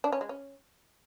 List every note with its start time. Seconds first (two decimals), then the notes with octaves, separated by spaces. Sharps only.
0.04 D4
0.12 C#4
0.21 G#3
0.29 C#4